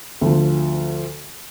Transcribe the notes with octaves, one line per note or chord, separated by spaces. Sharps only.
D2 F3